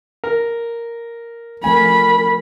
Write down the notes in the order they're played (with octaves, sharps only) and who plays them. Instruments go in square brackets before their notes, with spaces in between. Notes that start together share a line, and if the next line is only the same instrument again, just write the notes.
[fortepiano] A#4
[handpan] F3 A3 C4 [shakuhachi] A#4 [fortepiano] G#5 [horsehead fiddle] B5